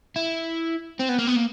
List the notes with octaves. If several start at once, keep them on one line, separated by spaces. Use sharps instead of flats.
E4
C4
B3
A#3
B3
A#3